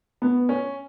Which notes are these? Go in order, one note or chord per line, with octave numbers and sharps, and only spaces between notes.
B3
C#4